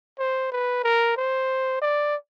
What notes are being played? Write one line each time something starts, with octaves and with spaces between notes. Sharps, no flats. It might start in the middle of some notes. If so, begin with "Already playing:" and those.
C5
B4
A#4
C5
D5